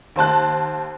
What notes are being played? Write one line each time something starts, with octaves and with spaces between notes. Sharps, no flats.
D#2 C5 A5 F#6